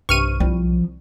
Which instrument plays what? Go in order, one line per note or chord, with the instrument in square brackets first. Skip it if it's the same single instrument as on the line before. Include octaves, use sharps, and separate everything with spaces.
[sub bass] B1 [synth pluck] G2 C3 [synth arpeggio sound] C#6 F6 D#7
[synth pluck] C2 G3 [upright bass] F3